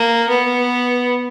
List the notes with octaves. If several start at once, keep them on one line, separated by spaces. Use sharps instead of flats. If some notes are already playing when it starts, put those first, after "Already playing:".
Already playing: A#3
B3